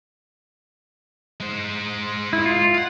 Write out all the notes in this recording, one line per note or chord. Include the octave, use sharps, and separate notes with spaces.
G#3 C5
E4
F4
F5 F#5